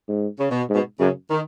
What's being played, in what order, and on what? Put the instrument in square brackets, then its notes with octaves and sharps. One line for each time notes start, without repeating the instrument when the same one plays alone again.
[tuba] G#2
[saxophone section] C#3
B2
[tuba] G#2
[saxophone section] B2
[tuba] F#2 [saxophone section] C#3
[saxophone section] D#3